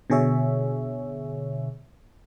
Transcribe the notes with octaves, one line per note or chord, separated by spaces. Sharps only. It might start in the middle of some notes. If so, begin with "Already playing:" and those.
B2 D3 G#4 C#5 E5